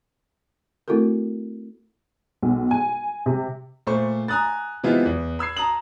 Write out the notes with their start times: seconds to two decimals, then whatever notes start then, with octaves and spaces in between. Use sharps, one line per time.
0.88 A3 C4 E4 F#4 A4 A#4
2.42 B1
2.71 G#5
3.26 C3
3.87 A#2 A3 C5 C#6
4.28 G#5 A#5 D#6 F#6 A6
4.84 C3 E3 G#3 B3 E4 F4
5.06 E2
5.39 B5 E6 G#6 C7
5.57 A5 A#5 D#6 F#7